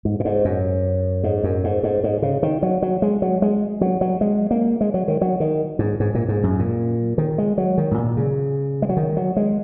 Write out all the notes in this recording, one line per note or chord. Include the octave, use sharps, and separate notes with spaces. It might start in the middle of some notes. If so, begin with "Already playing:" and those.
G#2
A#2
G#2
F#2
G#2
F#2
G#2
G#2
G#2
C#3
D#3
F#3
F#3
G#3
F#3
G#3
F#3
F#3
G#3
A#3
G#3
F#3
D#3
F#3
D#3
G#2
G#2
A#2
G#2
F#2
A#2
D#3
G#3
F#3
D#3
G#2
A#2
C#3
G#3
F#3
D#3
F#3
G#3